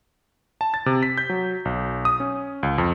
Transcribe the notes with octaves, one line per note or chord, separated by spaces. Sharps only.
A5
A6
C3
B6
G6
F#3
B1
D#6
C#4
C#2
F2